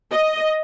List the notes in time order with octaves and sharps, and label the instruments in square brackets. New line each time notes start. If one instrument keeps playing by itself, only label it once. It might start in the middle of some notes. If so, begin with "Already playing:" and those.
[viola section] D#5